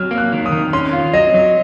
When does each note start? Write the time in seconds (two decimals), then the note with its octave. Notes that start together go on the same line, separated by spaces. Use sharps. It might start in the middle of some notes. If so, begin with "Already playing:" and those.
Already playing: F#3 F6
0.11 A#3
0.18 F#6
0.33 D#3
0.46 D#6
0.52 D#3
0.73 C#4 C6
0.93 F4
1.14 F#3 D#5
1.34 F#3